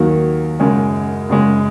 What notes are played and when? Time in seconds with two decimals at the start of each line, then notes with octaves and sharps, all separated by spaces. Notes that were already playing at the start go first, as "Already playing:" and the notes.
Already playing: D#2 D#3 F#3
0.60 F#2 C#3 G#3
1.29 F#2 C#3 G#3